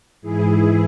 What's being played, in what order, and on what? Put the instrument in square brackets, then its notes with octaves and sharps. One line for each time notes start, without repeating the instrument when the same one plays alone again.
[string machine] G#2 E3 E4 G#4